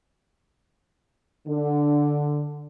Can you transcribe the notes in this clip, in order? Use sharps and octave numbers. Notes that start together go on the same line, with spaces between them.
D3